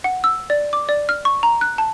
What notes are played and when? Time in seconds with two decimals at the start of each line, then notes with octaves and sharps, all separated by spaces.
0.04 F#5
0.24 E6
0.50 D5
0.73 D6
0.89 D5
1.09 F6
1.25 C#6
1.43 A#5
1.61 F#6
1.78 A5